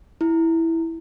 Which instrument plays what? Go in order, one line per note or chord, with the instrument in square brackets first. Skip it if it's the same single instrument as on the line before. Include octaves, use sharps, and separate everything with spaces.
[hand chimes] E4